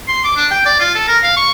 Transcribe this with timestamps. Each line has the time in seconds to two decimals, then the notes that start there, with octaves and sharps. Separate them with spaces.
0.08 C6
0.24 D6
0.36 D4
0.51 G5
0.66 D5
0.80 F4
0.95 A4
1.08 A#4
1.23 F5
1.37 C#6